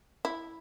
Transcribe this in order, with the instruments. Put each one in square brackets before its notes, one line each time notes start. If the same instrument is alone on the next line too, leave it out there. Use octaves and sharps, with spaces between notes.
[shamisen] E4